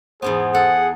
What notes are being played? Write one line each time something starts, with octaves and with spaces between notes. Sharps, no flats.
E2 G#2 B3 G#4 C5
G#4 A4 F#5